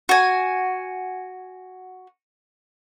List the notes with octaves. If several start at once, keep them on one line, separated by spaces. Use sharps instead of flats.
F#4 G#5